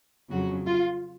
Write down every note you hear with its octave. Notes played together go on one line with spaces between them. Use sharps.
F2 C#3 F#3 F#4
F4